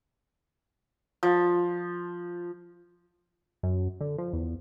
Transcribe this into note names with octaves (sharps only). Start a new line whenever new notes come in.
F3
F#2
D3
F3
E2